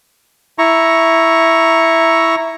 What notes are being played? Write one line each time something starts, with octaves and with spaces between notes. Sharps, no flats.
E4 A#5 C#6